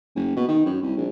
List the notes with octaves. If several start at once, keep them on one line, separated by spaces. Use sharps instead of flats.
F#1
B2
D#3
F#2
C2
A#1